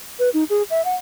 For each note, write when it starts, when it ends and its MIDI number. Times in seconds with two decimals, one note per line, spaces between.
0.19 0.29 71
0.34 0.44 63
0.50 0.63 68
0.70 0.84 76
0.85 0.95 78